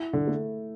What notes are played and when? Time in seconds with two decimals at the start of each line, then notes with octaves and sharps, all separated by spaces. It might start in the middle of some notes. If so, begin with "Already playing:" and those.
Already playing: E4
0.13 D3
0.27 A3